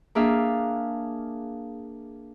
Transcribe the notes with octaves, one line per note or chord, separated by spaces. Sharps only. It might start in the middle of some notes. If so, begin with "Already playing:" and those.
A#3 D4 G#4 E5 F5